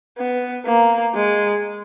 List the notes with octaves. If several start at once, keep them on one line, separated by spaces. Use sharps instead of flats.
B3
A#3
G#3